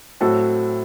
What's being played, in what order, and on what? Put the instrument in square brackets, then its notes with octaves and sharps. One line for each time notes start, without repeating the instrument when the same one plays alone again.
[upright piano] A2 F#3 C4 F#4 A4